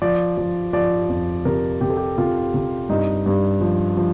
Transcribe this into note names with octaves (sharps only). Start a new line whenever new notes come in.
F3 D5
F3
F3 D5
F2
C3 A#4
C3 G4
A4
G4
C3 F4
C3
G2 D#4
G2
F3
F3